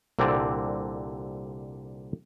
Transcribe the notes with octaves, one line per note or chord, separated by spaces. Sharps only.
C2 A#2 D3 C4 A4 D5